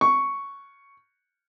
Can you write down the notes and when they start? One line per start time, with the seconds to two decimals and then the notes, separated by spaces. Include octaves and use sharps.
0.01 C#6